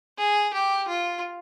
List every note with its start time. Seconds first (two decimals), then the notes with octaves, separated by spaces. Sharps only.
0.18 G#4
0.54 G4
0.88 F4